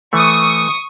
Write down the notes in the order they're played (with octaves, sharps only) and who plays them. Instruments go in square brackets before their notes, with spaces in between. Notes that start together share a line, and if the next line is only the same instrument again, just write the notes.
[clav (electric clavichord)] E3 A3 [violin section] C#6 D#6